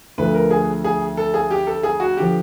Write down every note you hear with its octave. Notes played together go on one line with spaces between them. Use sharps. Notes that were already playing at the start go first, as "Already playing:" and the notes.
D2 D3 F3 B4
A#4
G#4
G#4
A4
G#4
G4
A4
G#4
F#4
D3 F3 G4